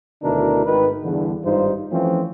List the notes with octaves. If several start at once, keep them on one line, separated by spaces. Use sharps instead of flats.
D2 B2 D#3 D4 E4 A#4
G#1 D#3 B4
E2 G2 D3
G#1 G2 D#4 F4 C5
E3 F3 A3 C4 C#4 F4